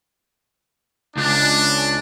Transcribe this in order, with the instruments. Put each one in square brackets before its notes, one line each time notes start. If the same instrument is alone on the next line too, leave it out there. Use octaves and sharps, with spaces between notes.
[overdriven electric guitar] C#2 [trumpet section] D4